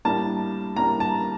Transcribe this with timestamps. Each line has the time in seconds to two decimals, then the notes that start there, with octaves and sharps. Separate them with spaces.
0.05 A2 G3 A#3 D4 A5
0.76 A2 G3 A#3 D4 A#5
1.00 A5